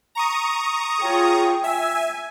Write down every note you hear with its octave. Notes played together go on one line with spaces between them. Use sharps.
A#5 C#6 D#6
F4 G#4 C#5 G5
E5 G#5